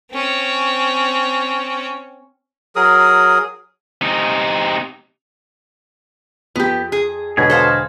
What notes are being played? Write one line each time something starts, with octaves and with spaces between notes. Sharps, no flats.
C4 C#4
F#3 G#4 A#4 D#6
C3 D#4
F2 B3 G4
G#4
E1 B2 D3 G#4 C#5 G#5
A4 C5 F5